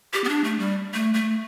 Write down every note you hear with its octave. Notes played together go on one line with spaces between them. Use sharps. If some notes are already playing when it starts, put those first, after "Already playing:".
G4
B3
D4
A3
G3
A3
A3